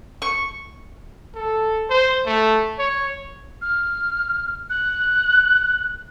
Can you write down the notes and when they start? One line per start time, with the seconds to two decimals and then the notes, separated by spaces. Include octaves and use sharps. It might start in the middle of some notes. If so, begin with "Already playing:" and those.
0.22 C#6
1.35 A4
1.90 C5
2.26 A3
2.79 C#5
3.62 F6
4.70 F#6